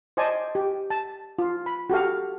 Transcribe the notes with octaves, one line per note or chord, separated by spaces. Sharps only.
C5 D5 D#5 G#5 A5
G4
A5
F4
B5
F#4 G4 A4 F5